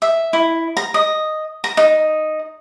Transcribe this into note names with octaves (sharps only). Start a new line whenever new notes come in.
E5
E4
A#5
D#5
A#5
D#4